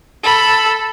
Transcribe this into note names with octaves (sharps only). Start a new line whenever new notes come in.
A4 B5